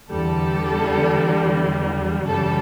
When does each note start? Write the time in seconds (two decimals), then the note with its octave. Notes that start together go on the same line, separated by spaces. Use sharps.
0.11 E2 D3 G3 A4
2.27 F#2 C#3 E3 G3 A4